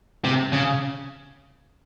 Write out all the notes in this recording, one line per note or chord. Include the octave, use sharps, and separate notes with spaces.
C3
C#3